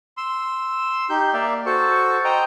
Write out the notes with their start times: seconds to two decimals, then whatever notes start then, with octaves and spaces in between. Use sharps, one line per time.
0.17 C6 E6
1.10 D#4 G4 G6
1.33 A#3 D5 E5 F5
1.66 F#4 A4 C5 C#6
2.24 C5 D#5 G5 A#5